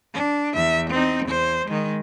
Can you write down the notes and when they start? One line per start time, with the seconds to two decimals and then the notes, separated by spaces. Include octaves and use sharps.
0.14 D4
0.54 E2 E5
0.90 C4 D#4
1.26 E2 C5
1.66 D#3 G#3